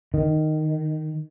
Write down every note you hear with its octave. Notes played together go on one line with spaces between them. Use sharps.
D#3